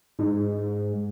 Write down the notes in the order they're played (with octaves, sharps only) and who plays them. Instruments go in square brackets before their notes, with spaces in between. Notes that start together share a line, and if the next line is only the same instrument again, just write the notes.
[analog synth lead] G#2